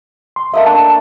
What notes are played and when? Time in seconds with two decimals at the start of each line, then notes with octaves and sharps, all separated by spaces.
0.36 C6
0.54 A3 A#3 D#5 E5
0.66 D4 A5